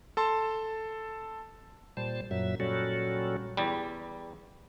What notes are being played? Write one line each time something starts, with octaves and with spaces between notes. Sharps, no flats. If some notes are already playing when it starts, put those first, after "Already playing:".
A4 A5 C6
A#2 G3 C5 A5
F#2 A#2 F#3 E5
A#2 F#3 G3 C#4 F#4 A4
E2 G3